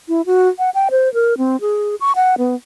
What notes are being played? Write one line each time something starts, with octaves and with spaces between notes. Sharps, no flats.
E4
F#4
F#5
G5
C5
A#4
C4
G#4
C#6
F#5
B3